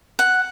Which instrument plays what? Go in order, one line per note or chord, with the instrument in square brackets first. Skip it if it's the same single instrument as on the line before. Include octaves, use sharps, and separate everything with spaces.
[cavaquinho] F#5